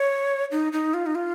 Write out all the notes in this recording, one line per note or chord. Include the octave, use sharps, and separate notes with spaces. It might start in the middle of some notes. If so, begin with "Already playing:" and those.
Already playing: C#5
D#4
D#4
F4
D#4
F4